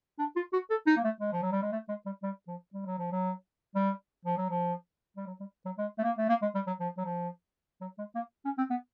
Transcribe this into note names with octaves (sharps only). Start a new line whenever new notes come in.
D4
F4
F#4
A4
D#4
A#3
A3
G#3
F3
F#3
G3
G#3
A3
G#3
G3
G3
F3
G3
F#3
F3
F#3
G3
F3
F#3
F3
G3
F#3
G3
F#3
G#3
A3
A#3
A3
A#3
G#3
G3
F#3
F3
F#3
F3
F#3
G#3
A#3
C#4
C4
B3